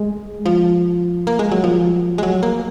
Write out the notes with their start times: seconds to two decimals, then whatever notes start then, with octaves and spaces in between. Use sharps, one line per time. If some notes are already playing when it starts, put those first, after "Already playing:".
Already playing: G#3
0.46 F3
1.27 A#3
1.39 G#3
1.52 F#3
1.64 F3
2.18 G#3
2.23 F#3
2.43 A#3